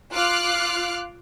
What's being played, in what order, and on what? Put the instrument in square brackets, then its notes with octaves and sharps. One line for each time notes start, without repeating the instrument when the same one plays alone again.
[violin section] F4 D6 F6 F#6 C7